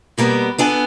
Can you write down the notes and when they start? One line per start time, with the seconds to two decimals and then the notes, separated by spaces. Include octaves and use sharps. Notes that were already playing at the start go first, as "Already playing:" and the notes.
0.18 B2 G3 A#3 B3
0.58 B3 D4 A4 G#5